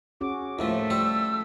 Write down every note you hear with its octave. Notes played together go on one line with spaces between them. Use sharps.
C#4 F#4 G#4 D6
D#2 A2 F3 A3 F4 E5
G3 A4 C5 E6